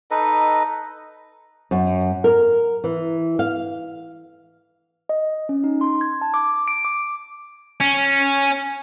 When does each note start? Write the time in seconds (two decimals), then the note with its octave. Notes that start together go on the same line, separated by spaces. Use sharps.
0.11 D#4 A4 B4 D#5
1.71 F#2
2.24 A#4
2.84 E3
3.39 F5
5.09 D#5
5.49 C#4
5.64 D#4
5.81 C6
6.01 G#6
6.21 A5
6.34 D6
6.68 D7
6.85 D6
7.81 C#4